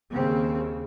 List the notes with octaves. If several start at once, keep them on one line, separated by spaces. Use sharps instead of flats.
D#2 C#3 C4